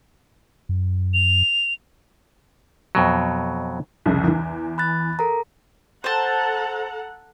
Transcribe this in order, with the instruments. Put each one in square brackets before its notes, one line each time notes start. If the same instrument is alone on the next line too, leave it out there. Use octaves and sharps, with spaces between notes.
[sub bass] F#2
[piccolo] F7
[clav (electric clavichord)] F2 B2 F#3
[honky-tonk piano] C2 F2 C#3
E2 E3
[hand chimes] B5 F#6 A6
A4 A#4 A#5
[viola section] A4 F#5 A#5 [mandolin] C5 A5